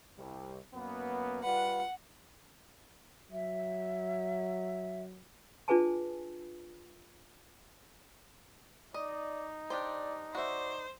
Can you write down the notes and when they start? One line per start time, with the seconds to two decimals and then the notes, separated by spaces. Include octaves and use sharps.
0.18 C2 G3
0.73 F#2 A#3 B3
1.44 G3 F4 B4 F#5
3.32 F#3 E5
5.68 D4 F4 G#4 B4 G#5 A5
8.94 D#4 D5 D#5
9.70 D4 G4 C5 D5
10.35 F#4 C5 D5 E5